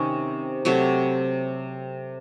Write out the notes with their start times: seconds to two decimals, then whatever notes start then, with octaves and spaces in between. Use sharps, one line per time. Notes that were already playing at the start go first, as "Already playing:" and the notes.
Already playing: C3 D#3 C#4 D#4
0.65 C3 F#3 A3